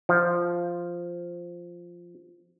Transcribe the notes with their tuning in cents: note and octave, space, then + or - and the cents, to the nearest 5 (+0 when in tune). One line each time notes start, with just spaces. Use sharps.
F3 -5